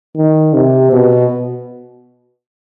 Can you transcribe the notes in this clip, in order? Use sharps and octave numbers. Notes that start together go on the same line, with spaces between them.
D#3
C3
B2